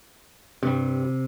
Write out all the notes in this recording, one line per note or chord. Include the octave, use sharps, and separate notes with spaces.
G2 C3 G3